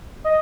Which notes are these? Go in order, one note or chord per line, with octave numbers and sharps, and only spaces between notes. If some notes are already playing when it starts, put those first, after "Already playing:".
D#5